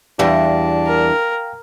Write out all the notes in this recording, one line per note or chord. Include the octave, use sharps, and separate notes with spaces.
E2 G3 D4 F5 G5 A#6
A#4